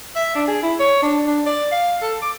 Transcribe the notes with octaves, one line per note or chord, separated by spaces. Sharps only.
E5
D4
G#4
E4
C#5
D4
D4
D5
F5
A4
D6